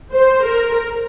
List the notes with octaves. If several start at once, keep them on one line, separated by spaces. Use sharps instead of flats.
C5
A#4